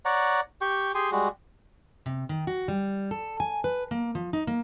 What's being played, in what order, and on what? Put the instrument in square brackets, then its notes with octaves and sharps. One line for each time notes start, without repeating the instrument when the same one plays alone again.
[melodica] C#5 D5 F#5 A#5
G4 G5 C#6
G4 G#4 G#5 C6
G3 G#3 F#4
[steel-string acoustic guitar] C3
D#3
F#4
G3
A4
G#5
B4
A#3
F3
D#4
A#3